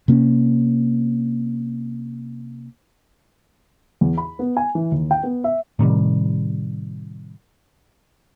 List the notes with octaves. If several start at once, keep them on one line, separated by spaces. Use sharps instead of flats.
C3 A#3 C4 C#4
E2
B5
B3
G#5
E3
D#2
G5
B3
E5
A2 C3 D#3 G3